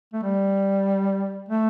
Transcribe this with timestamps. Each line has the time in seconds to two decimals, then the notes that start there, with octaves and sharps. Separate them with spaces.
0.13 A3
0.23 G3
1.49 A3